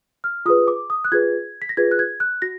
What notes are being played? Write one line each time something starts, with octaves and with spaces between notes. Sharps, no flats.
F6
F4 G#4 B4 D#6
D6
D#6
F#6
F4 G#4 B4 G#6
B6
A#6
F4 G#4 B4 G#6
F#6
G#6
F#6
F#4 A#6